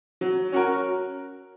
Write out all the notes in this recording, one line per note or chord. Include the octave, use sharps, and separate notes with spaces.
F#3
C#4 F#4 A#4